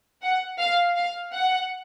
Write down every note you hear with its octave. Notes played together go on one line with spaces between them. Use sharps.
F#5
F5
F5
F#5